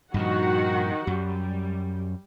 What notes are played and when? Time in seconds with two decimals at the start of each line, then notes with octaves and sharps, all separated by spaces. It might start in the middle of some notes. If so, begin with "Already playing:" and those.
0.14 G2 A#2 D#3 F3 F#4 F#5
1.07 F#2 G3